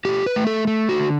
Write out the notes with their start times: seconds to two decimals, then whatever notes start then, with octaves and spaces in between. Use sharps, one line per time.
0.05 A3 G4
0.26 B4
0.36 A3
0.47 A4
0.67 A3
0.89 F#4
1.00 D3